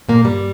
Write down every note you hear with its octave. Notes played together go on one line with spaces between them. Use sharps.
A#2 A#3
G2 G3